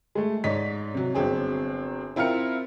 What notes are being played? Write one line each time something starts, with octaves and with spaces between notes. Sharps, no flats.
G#3 A3
G#2 D#4 C#5 D5 B6
C3 F#3
G1 F#3 C4 G#4
C4 E4 F4 A#4 F6 C#7